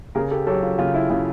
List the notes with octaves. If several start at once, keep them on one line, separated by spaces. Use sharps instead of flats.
C#3 G#4 A#4
G4 A4
F#3 G4 A4
F4
C#3 F4
E4
C#3 E4